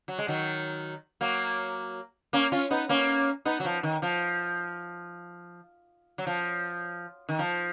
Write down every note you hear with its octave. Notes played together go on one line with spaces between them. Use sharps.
F#3
G#3
D#3 F#3
F#3 A#3
A#3 C#4
C#4 F4
B3 D#4
A#3 C#4
B3 D#4
F#3
F3
D#3
F3
F#3
F3
D#3
F3